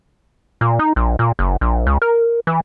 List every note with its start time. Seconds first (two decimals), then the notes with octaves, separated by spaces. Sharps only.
0.61 A#2
0.79 D#4
0.96 A#1
1.19 A#2
1.39 F#1
1.61 A#1
1.87 C#2
2.02 A#4
2.47 E3